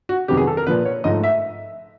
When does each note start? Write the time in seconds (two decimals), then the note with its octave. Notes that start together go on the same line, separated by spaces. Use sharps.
0.09 F#4
0.28 F2 C3 D#3 F#3 B3 G4
0.37 G#4
0.47 A4
0.57 A#4
0.67 A#2 F3 A#3 B4
0.85 C#5
1.04 G#2 F3 A3 D#5
1.24 E5